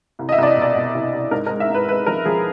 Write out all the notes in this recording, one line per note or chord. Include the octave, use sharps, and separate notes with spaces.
C2
D#5
E5
C2 D5
D#5
B2
D5
B2
C2
C2
G#2 A#4
A#4
G#3
E5
G#2 B4
G#3 B4
F3 A#4
F3 G#4